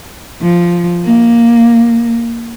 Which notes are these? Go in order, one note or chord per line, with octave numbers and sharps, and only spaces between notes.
F3
A#3